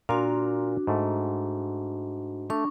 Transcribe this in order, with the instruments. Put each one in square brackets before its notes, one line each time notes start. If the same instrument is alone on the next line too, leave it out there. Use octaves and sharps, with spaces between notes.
[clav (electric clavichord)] A#2 F4 A#4 [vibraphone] D4 F#4
[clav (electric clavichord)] G#2 A3
[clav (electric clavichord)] A3 [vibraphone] D4 C#6